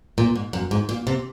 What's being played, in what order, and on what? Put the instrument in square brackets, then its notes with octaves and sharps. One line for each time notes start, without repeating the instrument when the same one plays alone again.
[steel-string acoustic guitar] A#2
G#2
F#2
G#2
A#2
C3